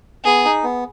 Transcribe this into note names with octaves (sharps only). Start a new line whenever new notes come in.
B3 G#4
D#4
B3